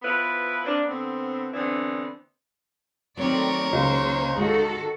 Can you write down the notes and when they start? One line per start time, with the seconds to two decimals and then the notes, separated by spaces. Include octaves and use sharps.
0.03 F3 B3 E4 B4
0.65 A#3 C4 D4
0.86 D3 B3 C4
1.53 D3 E3 B3 C4 D4
3.17 D#3 F#3 A3 C4 A#4 C#5 D5
3.73 C#2 C#3 A#3 C5
4.37 D#3 G#3 F#4 A4